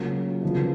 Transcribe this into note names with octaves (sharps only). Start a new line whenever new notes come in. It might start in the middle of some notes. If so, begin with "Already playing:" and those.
Already playing: C#3 F#3 A#3 F4
C#3 F3 B3 F4